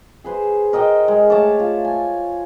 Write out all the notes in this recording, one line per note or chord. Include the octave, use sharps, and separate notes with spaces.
G#4 B4 C5
A#4 D#5 F#5 G5
G#3
A3 C#5 A5 D6
F4
G#5